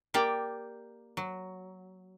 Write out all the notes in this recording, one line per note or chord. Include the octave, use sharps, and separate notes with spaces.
A#3 G4 D5 G5
F#3